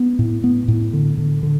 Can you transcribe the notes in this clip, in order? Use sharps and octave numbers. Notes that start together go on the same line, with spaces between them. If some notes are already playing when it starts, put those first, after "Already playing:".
Already playing: B3
A2
B3
A2
D3
D3
D3